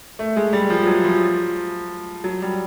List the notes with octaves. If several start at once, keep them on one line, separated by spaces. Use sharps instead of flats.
A3
G#3
G3
F3
F#3
F3
F#3
G3